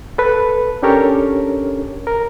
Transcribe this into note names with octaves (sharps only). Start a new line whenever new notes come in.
A4 B4
C#4 D4 G4 A4 A#4 C#5
A#4